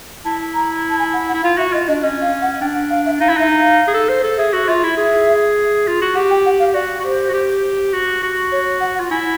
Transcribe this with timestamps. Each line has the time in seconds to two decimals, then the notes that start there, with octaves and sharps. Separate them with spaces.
0.25 E4 A5
0.54 A#5
0.90 A5
0.99 G#5
1.13 F#5
1.29 F#5
1.34 E4
1.43 F4 F5
1.58 F#4 E5
1.73 F4 D#5
1.88 D4 D#5
2.02 C#4 D#5
2.22 F5
2.42 F#5
2.61 D4 G5
2.75 F#5
2.90 F5
3.06 E5
3.20 D#4 F5
3.29 E4
3.37 D#4 E5
3.60 F5
3.88 G#4
3.94 A4
4.09 C5
4.23 A4
4.38 G#4 E5
4.53 F#4
4.68 F4 E5
4.83 E4
4.97 G#4 E5
5.87 F4
6.01 F#4
6.15 G4 F#5
6.30 G5
6.46 F#5
6.59 F5
6.74 F#4 D5
7.00 F#4
7.04 G4 C5
7.28 F#4
7.34 G4
7.92 F#4
8.23 F#4
8.52 C#5
8.81 F#5
8.95 F#5
9.00 F4
9.11 E4 G#5